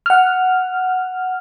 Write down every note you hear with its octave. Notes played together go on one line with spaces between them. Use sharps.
F#5 F6